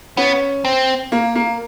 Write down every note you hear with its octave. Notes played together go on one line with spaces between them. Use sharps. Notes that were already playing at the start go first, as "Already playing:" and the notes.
B3 C#4
C4
A#3
A#3